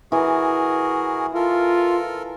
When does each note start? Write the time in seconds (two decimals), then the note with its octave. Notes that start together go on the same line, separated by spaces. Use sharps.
0.12 E3 F#4 G#4 A#4
1.35 F4 A4 A#4